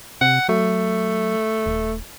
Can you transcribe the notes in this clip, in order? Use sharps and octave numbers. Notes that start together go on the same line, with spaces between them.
C3 F#5
F#3 A3
D#1